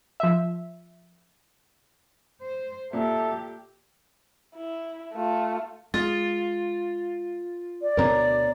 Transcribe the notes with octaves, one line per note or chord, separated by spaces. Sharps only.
F3 E5
C5
A#2 G4 A4 E5
E4
A3 F4
G#3 F4 A6
D5
D2 B2 A#4 C#5 A#5